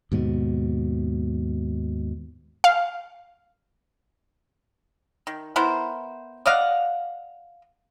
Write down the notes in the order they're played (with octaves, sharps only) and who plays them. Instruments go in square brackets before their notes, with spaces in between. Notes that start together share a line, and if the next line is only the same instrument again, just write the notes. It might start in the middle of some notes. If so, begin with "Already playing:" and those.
[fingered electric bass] D#2 G#2 B2
[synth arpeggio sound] F5
[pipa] D#3
B3 E4 A#4 C5
D5 D#5 F5 F#5